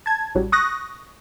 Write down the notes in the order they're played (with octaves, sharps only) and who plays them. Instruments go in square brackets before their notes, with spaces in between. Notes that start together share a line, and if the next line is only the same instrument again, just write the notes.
[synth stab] A5 G#6
A1 F#3 G3
C#6 D#6 F#6 A#6